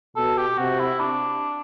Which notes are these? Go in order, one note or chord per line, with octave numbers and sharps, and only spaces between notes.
B2 A4
G4
C3 F#4
E4
D4